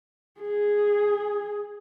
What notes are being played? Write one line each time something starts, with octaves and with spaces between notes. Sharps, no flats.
G#4